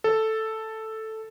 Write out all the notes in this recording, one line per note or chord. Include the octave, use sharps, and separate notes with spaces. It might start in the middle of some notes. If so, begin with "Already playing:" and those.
A4